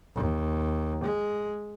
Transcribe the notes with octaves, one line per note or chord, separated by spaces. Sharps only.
D#2
G#3